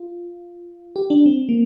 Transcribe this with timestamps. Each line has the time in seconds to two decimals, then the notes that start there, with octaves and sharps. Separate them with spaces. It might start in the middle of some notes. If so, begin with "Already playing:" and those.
Already playing: F4
0.96 G4
1.10 D4
1.26 C4
1.49 A#3